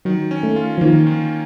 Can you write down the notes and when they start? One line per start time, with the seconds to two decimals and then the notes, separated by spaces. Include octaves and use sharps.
0.05 D#3 F#3
0.31 C#4
0.43 A3
0.56 F4
0.78 F3
0.81 D#3 A#3
1.07 D#3